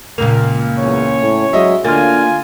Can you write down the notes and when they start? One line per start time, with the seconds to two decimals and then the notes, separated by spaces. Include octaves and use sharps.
0.18 C#2 A#2 A#3 F7
0.79 E2 C#4 C#5
1.21 A2
1.53 F#3 G#3 D#5 E5
1.85 D3 A#3 F4 G#5 F6 A6